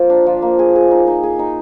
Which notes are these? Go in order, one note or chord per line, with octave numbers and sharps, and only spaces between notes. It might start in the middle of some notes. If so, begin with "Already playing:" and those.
Already playing: F3 A#3
D4
F3
A#3
G#4
G#4
D#4
D#4
G#4
D#4